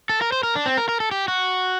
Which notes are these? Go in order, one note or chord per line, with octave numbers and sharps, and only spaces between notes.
A4
A#4
C5
A#4
D4
C4
A#4
A#4
A4
G4
F#4